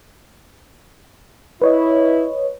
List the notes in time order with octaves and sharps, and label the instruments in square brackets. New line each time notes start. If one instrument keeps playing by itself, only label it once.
[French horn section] E4 [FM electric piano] B4 C#5 D#5